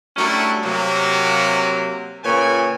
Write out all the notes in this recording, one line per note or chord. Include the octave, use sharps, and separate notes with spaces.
F#3 G3 A3 C#4 D4 E4
C3 F#3 A#3
A#2 C#3 B4 C#5 G5 G#5